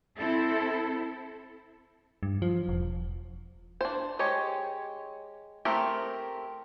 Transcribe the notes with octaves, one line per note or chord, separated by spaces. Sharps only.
C4 E4 A4
G2
F3
E1
D4 C5
G#3 G4 C#5
A3 C4 G4 A#4